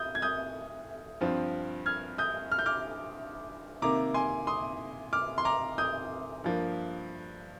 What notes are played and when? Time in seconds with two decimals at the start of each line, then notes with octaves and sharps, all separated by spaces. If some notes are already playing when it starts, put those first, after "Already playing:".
Already playing: D#6 G6
0.15 G#6
0.22 D#6 G6
1.21 G2 F3 C4
1.86 F6 G#6
2.18 D#6 G6
2.52 F6
2.59 G6
2.66 D6 F6
3.82 C3 D#3 A#3 A#5 D6
4.14 G#5 C6
4.47 C6 D#6
5.13 D6 F6
5.38 C6
5.45 A#5 D6
5.78 D#6 G6
6.44 G2 F3 A#3